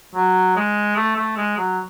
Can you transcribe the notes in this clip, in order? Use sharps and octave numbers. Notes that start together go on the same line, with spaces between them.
F#3
G#3
A3
A3
G#3
F#3